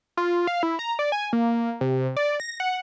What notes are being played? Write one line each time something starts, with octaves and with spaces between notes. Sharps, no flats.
F4
F5
E4
A#5
D5
G#5
A#3
C3
D5
A#6
F#5